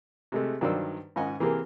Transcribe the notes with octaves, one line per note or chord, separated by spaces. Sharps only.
C3 G#3 A3
G2 D#3 F#3 C5 D5 E6
G#2 D#3 C#4 D#5 F#5 G#5
E3 A#3 C4 G4 G#4 A#4